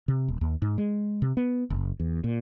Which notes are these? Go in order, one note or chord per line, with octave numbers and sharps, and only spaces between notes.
C3
D#1
D#2
G#2
G#3
C3
B3
F#1
E2
A#2